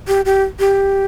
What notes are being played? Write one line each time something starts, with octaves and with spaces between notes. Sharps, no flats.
G4
G4
G4